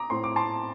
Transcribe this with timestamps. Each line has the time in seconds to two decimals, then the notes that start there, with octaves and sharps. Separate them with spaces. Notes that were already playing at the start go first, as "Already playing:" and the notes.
Already playing: A#5 D6 D#6
0.10 A2 A3 C4 C6
0.24 D6
0.36 A5 C6